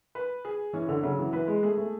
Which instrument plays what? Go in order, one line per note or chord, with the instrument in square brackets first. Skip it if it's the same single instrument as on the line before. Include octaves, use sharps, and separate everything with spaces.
[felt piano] B4
G#4
[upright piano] E3 [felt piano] C#4
[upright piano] D3
[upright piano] C#3 [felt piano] F#3
[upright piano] E3
[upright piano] E3 [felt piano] B4
[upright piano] G#3
[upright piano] A3 [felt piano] G#4
[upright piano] A3